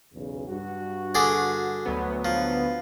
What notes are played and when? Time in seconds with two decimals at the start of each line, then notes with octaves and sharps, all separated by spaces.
0.14 B1 E2 C#3
0.48 G2 F#4
1.15 D3 G#4 D5
1.86 D2 F#3 B3
2.25 F3